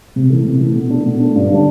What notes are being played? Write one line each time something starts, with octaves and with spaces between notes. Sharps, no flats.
C3
E3 A3
C3
E3 A3
B2
A3 D4
B2
A3 D4
G2
D3 G3 D4